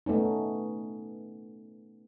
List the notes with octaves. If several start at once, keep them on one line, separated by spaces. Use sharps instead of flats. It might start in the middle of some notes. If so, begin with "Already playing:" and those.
A3 B3 C#4 D#4